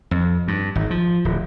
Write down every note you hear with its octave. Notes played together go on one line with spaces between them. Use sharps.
F2
G2
G#1
F3
D1